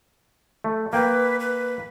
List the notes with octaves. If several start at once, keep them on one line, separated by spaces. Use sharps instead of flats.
A3
A#3 B4 G5
B4